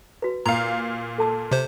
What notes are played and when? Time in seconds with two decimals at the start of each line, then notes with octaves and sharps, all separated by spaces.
0.22 F#4 B4
0.46 A#2 F5 A#5
1.18 A4 A5 E6
1.51 C3 C5